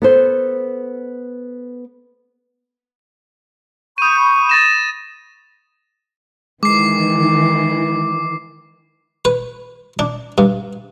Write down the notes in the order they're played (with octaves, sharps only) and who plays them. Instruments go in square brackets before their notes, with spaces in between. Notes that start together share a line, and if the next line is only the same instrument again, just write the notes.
[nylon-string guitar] B3 A4 C5
[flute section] B5 C#6 G6 [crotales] D#6 D#7
[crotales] A6 A#6 E7
[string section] D#3 E3 [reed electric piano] G#3 [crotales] D6 C7
[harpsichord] B4
D4
G2